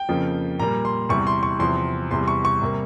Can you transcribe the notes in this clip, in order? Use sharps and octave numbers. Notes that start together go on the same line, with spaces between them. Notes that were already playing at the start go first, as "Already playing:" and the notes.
Already playing: G5
F2 C#3 F3 A#3
A#2 G3 A#3 A#5
C6
E2 C3 E3 G3 C#6
C6
C#6
E2 C3 F3 C6
E2 C3 G3 C6
C#6
C#6
C3 G3 A#3